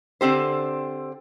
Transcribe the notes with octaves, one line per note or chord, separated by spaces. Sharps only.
D3 C4 G4 C5